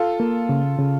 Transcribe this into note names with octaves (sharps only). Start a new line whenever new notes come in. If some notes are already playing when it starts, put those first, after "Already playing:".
Already playing: F4 A4
A#3
C#3
C#3